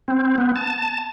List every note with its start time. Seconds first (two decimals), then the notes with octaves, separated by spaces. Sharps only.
0.08 C4
0.38 B3
0.56 A5
0.78 A5